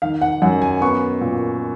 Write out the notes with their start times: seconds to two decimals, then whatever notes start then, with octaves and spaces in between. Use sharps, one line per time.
0.02 D#3 F5
0.21 F#5
0.42 F#2 F#5
0.62 G#5
0.81 B3 C#6
1.21 A#2